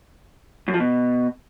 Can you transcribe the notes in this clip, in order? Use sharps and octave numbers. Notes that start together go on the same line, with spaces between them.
F#2
F3
B2